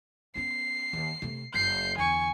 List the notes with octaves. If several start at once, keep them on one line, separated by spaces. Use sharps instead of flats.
B3 C#4 C7
D#2
C3 A3
F#1 G6 C7
E2 D3 G#5 C#6